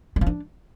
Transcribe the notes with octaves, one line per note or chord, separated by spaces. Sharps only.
G3
F3
D4